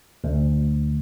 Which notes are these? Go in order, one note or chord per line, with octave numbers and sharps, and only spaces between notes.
D2